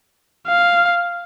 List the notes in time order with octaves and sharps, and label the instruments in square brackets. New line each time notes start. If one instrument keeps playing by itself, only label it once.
[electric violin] F5